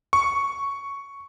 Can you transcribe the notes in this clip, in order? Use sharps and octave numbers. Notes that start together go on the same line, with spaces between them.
C#6